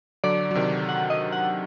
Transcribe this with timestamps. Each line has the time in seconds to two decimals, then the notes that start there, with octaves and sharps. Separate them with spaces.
0.24 D3 F#3 D5
0.51 F#3
0.55 C3 D#3
0.89 F#5
1.10 D#5
1.32 F#5